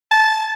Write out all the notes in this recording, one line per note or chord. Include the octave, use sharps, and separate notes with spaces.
A5